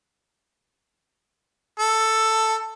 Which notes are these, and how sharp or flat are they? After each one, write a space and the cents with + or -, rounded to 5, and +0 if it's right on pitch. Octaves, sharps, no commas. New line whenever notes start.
A4 +10